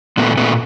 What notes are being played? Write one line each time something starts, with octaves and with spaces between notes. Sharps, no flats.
A#2 A3 B3
A#2 A3 B3